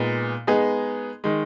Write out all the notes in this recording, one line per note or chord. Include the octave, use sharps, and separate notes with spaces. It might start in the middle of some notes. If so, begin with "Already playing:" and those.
Already playing: A#2 G#3 B3 D#4
G#3 B3 D#4 G#4
D#3 G#3